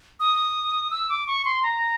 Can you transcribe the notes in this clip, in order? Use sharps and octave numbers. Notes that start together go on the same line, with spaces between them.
D#6
E6
D6
C#6
C6
A#5